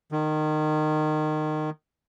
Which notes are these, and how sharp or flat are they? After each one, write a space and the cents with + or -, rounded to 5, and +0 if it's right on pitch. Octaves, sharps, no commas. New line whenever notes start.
D#3 -20